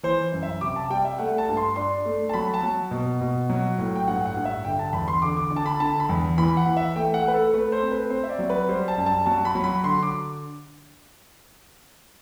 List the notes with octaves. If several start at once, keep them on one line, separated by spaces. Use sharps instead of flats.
E3 C5
F#2
E5
C3 D6
A5
G3 G5
E5
A3 F#5
A5
G2
C6
D4 C6
A3
A5
F#3 B5
A5
F#3
B2
B2
F#3
A2
G5
G2 F#5
F#5
G2
E5
D3 G5
A5
E2 B5
C6
D3 D6
D6
D3
A5
B5
D3 A5
B5
E2
E3 B5
F#5
E3
E5
A3 G5
F#5
A3 B4
A4
A3 B4
C5
C4
B4
C4 C5
E5
D5
F#3
B4
G3 C5
A5
F#2
A5
F#3 A5
B5
F#3
B5
D3 C6
D6